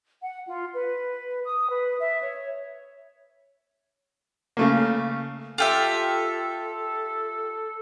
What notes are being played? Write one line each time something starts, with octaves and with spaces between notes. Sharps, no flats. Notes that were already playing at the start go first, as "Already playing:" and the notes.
F#5
F4
B4
D#6
B4
E5
C#5
C#3 A3 A#3
F4 G4 A4 E5